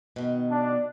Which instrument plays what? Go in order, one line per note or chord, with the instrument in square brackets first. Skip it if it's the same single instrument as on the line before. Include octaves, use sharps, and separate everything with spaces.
[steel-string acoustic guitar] B2 D#3
[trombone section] D4